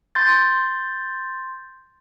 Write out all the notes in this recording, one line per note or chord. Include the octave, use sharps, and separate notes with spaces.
C6 G6 A6